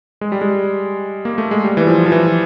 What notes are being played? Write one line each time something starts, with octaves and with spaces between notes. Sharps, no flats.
G#3
G3
G#3
A#3
A3
G#3
G3
E3
F3
F3
E3